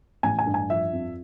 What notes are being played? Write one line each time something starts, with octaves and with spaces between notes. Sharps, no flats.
A1 G#5
G#5
G2
G#5
F3 E5
F2